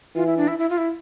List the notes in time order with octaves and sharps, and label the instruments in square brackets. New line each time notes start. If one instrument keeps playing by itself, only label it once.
[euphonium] E3 [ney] F4
[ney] E4
D4
E4
E4
F4
E4